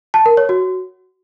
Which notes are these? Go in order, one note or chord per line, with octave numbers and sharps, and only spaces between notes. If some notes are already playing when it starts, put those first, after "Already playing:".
A5
A#4
C#5
F#4